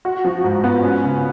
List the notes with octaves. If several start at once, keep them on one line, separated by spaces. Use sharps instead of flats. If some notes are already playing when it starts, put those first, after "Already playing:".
F#4
F3
G#2
B3
C#4
C#3